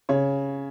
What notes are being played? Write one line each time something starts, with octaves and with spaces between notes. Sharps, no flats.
C#3 C#5